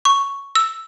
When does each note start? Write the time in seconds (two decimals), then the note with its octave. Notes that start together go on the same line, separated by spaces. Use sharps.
0.05 C#6
0.55 E6